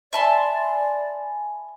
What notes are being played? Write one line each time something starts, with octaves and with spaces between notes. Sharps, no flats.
D5 E5 G#5 A5 B5 C6